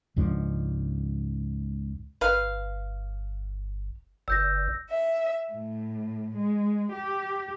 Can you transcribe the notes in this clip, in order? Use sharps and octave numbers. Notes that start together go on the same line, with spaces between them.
C#2 G#2 F3 D4
G1 B4 F5
G1 E6 G6 A#6
E5
A2
G#3
G4